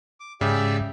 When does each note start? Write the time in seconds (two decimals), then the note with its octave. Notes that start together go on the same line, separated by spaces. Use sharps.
0.20 D6
0.41 G#2 C#3 G4 D5 E5